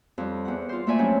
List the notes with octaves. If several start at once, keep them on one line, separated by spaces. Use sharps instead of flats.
F2 G3
E2 F#5
F4 C5
A3 A#3 F4 D5 E5 G#5
F#3 G3 C4 C#4 E4